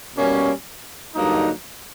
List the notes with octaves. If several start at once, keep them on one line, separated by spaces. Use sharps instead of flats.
B2 G3 A#3 C#4
G2 D3 F#3 A#3 D#4